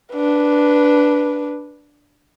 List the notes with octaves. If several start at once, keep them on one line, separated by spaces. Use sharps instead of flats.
D4 B4